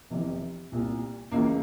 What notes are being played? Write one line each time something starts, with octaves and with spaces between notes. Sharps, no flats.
F1 F2 C3 E3
C2 A#2
C#2 C#3 E3 A#3